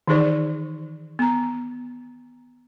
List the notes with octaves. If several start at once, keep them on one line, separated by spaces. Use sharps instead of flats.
D#3 E3 D#4 G#4 C5 D5
B3 A#5